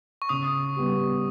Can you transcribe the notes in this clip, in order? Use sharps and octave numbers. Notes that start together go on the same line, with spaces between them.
C#6
C#3 D#6
G3 B3 G4